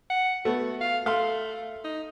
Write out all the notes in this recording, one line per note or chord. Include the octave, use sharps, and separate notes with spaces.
F#5
A3 B3 F#4
F5
A3 F5 C6
D#4